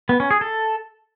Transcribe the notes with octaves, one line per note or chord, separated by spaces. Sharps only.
B3
C#4
G#4
A4